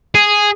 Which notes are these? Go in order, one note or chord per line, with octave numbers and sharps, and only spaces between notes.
G#4